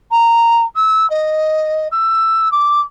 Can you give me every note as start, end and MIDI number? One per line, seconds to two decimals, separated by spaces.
0.11 0.65 82
0.75 1.08 88
1.10 1.87 75
1.91 2.51 88
2.51 2.80 86